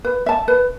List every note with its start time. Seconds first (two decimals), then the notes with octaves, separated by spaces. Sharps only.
0.05 B4
0.26 E5 A5
0.48 B4